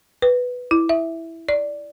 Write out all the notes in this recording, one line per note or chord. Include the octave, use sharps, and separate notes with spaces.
B4
E4
E5
D5